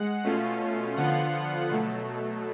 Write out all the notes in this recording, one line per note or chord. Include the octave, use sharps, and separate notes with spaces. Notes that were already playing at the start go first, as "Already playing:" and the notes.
Already playing: G#3 F#5
B2 A3 C#4 F4
D3 F3 B3 F4 F#5
B2 F#3 A3